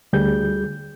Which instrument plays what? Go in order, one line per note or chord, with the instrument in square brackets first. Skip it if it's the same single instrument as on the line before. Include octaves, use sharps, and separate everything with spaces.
[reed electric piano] D2 G3 G#4 G6